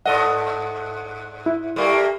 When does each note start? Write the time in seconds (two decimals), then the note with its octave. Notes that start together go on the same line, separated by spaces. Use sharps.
0.06 G#2 A4 D#5 F#5
1.46 E4
1.76 G3 A3 A#3